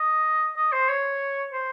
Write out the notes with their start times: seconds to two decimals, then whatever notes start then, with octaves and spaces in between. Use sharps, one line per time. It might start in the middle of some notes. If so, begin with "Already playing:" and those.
Already playing: D#5
0.57 D#5
0.72 C5
0.89 C#5
1.52 C5